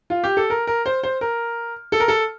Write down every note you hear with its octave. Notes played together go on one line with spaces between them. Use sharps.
F4
G4
A4
A#4
A#4
C5
C5
A#4
A4
A#4
A4